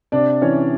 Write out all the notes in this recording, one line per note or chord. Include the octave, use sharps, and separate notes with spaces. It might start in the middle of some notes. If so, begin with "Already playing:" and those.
C3 D4 D5
E3 C#4 C#5